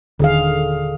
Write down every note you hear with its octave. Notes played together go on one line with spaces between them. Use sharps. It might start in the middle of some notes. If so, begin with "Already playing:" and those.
D#1 D3 D#3 G#4 F5